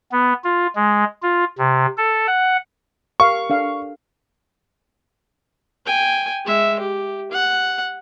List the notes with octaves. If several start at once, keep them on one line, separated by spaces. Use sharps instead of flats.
B3
F4
G#3
F4
C3
A4
F#5
G4 A#4 F5 C#6
D4 A4 F5
G5 G#5
G#3 E5
G4
F#5